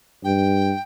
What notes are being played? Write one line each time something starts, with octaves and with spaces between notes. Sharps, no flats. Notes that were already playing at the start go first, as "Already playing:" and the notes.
G2 G5